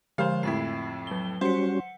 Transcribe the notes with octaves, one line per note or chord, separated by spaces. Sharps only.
D3 F3 G#3 C5 F5
F2 A2 E4 C7
F#3 G7
G3 C#4 F#4 C5 F#5 C#7